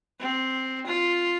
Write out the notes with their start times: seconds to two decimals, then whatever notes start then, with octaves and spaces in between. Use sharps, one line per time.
0.20 C4
0.86 F4